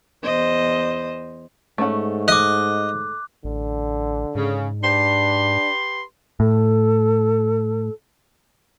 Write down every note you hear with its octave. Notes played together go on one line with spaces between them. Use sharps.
E2 C5 D#5
G#2 A3 C#4 F#5
D#5 D6 F#6
A1 D3
G#2 C#3
D4 G4 B4 C6
A2 A4